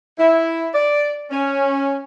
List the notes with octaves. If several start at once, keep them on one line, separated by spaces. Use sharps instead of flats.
E4
D5
C#4